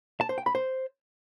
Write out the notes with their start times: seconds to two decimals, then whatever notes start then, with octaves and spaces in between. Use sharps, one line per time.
0.21 A5
0.29 C5
0.38 G5
0.46 B5
0.55 C5